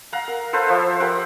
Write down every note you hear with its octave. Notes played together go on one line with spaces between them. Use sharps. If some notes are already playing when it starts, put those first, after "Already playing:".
F5 F#5 A#5
A#4
A4 B4 C5 F5
F3 C5 E5 F5
G4 A#4 F#5